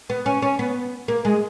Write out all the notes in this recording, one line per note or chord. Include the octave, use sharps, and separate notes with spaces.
B3
C#4
C#4
B3
A#3
G#3